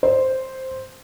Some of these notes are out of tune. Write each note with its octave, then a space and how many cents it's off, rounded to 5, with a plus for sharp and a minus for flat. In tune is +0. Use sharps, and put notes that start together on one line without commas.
C5 +0